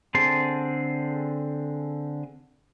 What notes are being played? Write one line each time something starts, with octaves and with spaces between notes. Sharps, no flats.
D3 C4 G#4 A5 C6